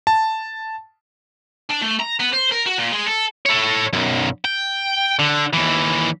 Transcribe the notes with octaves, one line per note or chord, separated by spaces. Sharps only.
A5
D4
A3
A#5
B3
C5
A#4
F#4
A#2
G#3
A4
A4 C#5
B1 F#2
G5
D3
D#2 E3